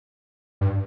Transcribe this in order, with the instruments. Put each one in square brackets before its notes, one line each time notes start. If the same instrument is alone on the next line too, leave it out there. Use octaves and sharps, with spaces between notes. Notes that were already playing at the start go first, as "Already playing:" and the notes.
[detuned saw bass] G2